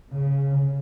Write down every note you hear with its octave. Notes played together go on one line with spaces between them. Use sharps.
C#3